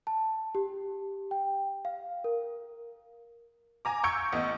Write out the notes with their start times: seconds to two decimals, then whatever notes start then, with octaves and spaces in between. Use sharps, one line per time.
0.07 A5
0.55 G4
1.31 G5
1.85 F5
2.24 A#4
3.85 G#5 A#5 D6
4.04 C#6 E6 G6 G#6 C#7 D7
4.33 A1 B3 D#5